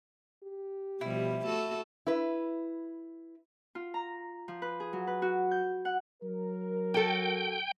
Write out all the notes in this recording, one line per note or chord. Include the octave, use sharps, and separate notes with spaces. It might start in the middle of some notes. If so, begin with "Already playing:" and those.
G4
B2 F3 G3 E4
A3 F#4 A4
E4 B4
F4
A#5
F3
B4
G#4
F#3
B4
F#4
G6
F#5
F#3 A#4
F#4 A4 G5